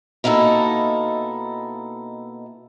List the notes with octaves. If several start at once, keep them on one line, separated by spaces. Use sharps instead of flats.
B2 A#3 D#4 E4 A4